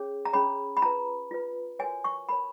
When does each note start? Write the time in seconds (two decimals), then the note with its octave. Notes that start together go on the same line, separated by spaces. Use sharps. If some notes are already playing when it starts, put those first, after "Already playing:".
Already playing: C#4 G#4 C#5
0.25 A#5
0.33 C#4 G#4 C#5 B5
0.77 B5
0.82 F4 B4 A#5
1.31 F4 B4
1.79 F#4 A#4 C#5 G#5
2.04 C#6
2.29 F#4 A#4 C#5 B5